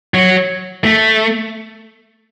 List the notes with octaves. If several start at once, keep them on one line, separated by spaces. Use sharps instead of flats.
F#3
A3